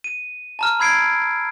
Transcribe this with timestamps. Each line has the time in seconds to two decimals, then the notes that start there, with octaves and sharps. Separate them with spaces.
0.04 D#7
0.59 A5 A#5 F6
0.80 B5 E6 G#6 C7 D7